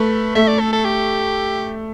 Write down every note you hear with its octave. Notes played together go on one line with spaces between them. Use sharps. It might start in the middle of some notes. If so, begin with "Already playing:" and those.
Already playing: A3 B4
A3 E5
D5
A4
A4
G4